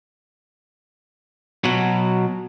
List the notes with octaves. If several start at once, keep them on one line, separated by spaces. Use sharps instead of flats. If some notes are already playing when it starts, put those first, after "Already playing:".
B2 F#3